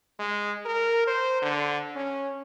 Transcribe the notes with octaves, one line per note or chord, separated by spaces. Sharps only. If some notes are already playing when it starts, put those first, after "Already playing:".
G#3
A#4
C5
D3
C#4